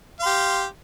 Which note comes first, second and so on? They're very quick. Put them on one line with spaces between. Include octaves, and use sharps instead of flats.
F5 C6 G4